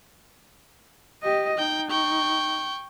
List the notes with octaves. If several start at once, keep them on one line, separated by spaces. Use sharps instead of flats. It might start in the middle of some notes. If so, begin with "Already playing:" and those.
G4 D#5
D#4 G5
G5 C#6